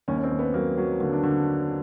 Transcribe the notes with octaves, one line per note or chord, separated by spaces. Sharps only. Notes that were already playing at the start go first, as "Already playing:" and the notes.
D#2 C#4
C#4
C4
D#2
B3
F#3 A#3
F#3
D3 A#3
D4
D3